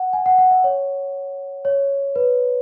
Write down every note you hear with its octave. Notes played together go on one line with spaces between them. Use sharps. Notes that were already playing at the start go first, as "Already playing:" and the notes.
Already playing: F#5
G#5
F#5
F#5
E5
C#5
C#5
B4